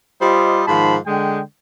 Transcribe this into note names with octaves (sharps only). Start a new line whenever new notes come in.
G3 F4 G4 C5 D#5
G#2 D#3 F3 A5 B5 C6
D3 G#3 G5